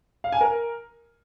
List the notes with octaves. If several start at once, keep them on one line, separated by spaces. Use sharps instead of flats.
F5
G#5
A#4